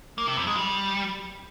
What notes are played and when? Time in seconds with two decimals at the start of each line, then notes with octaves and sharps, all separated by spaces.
0.18 A#3
0.28 C3
0.37 F2
0.47 G#3
0.57 G3